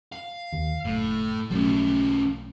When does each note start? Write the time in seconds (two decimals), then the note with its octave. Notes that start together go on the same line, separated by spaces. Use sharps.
0.12 F5
0.53 D#2
0.85 F#1 A2
1.50 B1 F3 F#3 A3 C#4